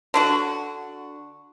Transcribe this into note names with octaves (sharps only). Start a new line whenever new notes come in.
D3 D4 F#4